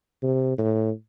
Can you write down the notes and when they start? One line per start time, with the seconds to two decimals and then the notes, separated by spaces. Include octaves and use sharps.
0.23 C3
0.58 A2